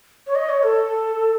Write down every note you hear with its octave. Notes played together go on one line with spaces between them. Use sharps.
C#5
D#5
C#5
A4